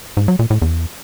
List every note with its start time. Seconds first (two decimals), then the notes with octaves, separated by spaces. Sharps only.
0.17 G#2
0.28 F#3
0.39 A#2
0.50 A2
0.62 E2